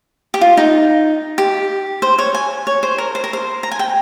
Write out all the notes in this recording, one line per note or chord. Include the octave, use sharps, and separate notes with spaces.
G4
F4
D#4
G4
C5
C#5
G#5
C#5
C5
A#4
C5
A#4
C5
A#5
G#5
G5